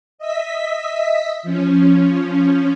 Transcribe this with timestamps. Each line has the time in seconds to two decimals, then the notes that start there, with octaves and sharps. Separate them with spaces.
0.19 D#5 E5 B6
1.43 F3 C#4